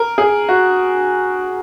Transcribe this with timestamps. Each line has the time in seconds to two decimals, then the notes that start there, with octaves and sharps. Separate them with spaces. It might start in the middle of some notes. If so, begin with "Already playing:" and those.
Already playing: A#4
0.18 G#4
0.49 F#4